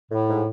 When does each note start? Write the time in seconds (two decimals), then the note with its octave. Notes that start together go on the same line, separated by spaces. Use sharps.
0.10 A2
0.27 G#2